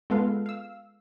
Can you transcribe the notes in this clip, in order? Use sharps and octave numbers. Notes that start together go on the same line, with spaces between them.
G#3 B3 F4 A4 B4 F5
F5 E6